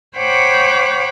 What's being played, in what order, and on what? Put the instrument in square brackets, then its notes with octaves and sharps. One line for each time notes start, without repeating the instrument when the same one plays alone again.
[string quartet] C5 C#5 F#5 G5 B5 D6